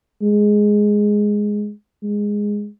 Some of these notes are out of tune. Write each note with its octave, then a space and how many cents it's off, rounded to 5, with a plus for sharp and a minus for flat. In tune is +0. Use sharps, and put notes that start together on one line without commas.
G#3 +0
G#3 -10